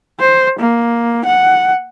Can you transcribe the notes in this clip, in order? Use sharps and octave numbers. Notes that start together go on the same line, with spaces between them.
C5
A#3
F#5